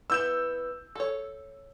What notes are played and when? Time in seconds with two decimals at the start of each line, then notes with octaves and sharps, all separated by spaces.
0.10 B3 E4 B4 E6 G6 E7
0.95 A4 C#5